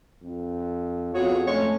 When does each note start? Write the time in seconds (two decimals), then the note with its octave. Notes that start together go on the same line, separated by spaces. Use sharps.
0.23 F2
1.14 F2 B3 F4 F#4 G#4 C#5
1.48 G#3 A3 C#4 C#5